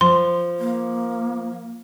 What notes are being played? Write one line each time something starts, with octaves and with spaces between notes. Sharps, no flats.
F3 C6
A#3